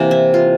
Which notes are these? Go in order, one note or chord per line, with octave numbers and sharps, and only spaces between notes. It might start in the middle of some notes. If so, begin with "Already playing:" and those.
Already playing: C3 E3 A#3
E4
F4